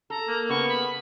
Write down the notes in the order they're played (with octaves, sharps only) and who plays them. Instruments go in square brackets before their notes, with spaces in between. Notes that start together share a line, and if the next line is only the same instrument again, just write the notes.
[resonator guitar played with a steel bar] A4 [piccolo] A#5
[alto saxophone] A#3
[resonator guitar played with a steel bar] C#3 B3 [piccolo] C#6
[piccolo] B5